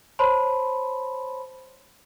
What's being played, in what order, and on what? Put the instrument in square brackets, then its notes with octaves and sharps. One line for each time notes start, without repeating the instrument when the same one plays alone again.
[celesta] C5 C#5 A5 B5 C6